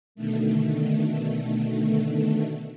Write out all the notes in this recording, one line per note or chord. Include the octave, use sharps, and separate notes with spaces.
B2 D3 D#3 A3